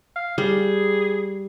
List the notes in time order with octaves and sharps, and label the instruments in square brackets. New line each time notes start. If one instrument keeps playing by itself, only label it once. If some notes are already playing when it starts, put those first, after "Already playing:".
[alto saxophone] F5
[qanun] G3 [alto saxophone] G#4